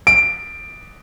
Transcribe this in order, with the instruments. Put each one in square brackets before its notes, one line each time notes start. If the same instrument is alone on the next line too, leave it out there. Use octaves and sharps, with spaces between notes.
[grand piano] D7